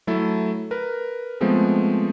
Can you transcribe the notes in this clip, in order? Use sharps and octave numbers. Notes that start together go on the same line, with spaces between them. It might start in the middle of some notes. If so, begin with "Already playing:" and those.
F#3 A3 E4 A4
A#4 B4
F3 G#3 A3 B3 C4